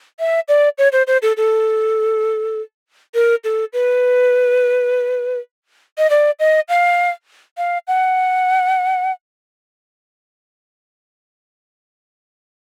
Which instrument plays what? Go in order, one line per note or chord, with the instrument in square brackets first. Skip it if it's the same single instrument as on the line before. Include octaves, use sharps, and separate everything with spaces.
[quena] E5
D5
C#5
C5
C5
A4
A4
A#4
A4
B4
D#5
D5
D#5
F5
F5
F#5